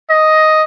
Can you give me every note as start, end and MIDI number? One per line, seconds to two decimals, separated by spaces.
0.10 0.63 75